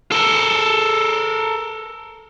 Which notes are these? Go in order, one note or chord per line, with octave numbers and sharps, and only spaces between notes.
A4 A#4